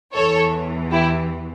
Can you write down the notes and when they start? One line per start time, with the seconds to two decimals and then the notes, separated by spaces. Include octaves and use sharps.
0.14 E2 E3 A4 C#5
0.91 E4 G4